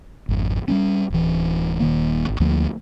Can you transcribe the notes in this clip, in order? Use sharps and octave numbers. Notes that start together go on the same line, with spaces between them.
G#1 F2
G3 B3 C#4
D1 E3
D#1 D#3 A#3
G#1
D2 F3 A3 A#3